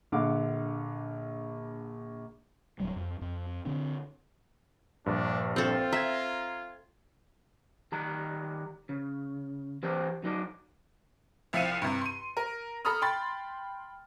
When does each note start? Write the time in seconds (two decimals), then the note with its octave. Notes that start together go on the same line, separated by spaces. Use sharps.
0.12 A#1 D3 F5 F#5 D6
2.80 D1 F#3 G3
2.96 F2
3.21 F2
3.65 D3 C4 D4
5.06 A#1 G2 D4
5.56 C4 F4 A4
5.93 E5 A#5 G#6
7.92 D#3 G3 A#5
8.89 C#3
9.83 E3 C4 G4 C5 D5
10.24 F#3 D#4 D5
11.53 C2 F3 E5 F5 C#7 D#7
11.82 G2 C3
12.02 C6 D#7
12.37 A#4
12.85 A4 A#5 B5 D#6 F6
13.02 G5 B5 C6 A6